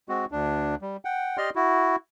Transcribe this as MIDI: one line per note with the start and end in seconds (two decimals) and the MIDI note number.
0.09 0.25 56
0.09 0.25 60
0.09 0.25 66
0.32 0.75 38
0.32 0.75 62
0.82 0.97 55
1.05 1.37 78
1.05 1.37 79
1.38 1.50 67
1.38 1.50 74
1.38 1.50 75
1.38 1.50 84
1.38 1.50 89
1.55 1.96 64
1.55 1.96 66